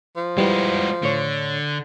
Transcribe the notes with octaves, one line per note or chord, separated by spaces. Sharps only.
F3
G3 G#3 E4 F#4 B4
A2 D3 C#5